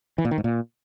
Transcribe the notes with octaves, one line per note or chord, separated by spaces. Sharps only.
E3
A#2
D#3
G#2
A#2